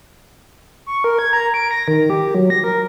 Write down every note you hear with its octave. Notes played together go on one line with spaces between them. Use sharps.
C#6
A#4
G#6
A#5
D7
A#6
D#3
G4
F#3
A#6
A#4